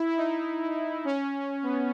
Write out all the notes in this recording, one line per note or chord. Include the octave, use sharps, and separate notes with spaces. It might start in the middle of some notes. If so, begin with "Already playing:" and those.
Already playing: E4
D#4
C#4
B3